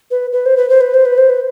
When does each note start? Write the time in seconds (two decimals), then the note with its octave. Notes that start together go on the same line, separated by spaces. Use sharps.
0.11 B4
0.32 B4
0.46 C5
0.57 B4
0.69 C5
0.81 B4
0.94 C5
1.05 B4
1.18 C5
1.30 B4